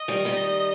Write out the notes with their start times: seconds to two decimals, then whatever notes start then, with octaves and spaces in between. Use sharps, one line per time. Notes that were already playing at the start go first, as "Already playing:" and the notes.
Already playing: D#5
0.08 D#3 G3
0.25 D#3 G3